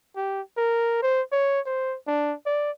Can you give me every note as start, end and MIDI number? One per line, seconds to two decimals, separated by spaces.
0.16 0.41 67
0.57 1.00 70
1.03 1.22 72
1.32 1.60 73
1.66 1.96 72
2.08 2.34 62
2.46 2.71 74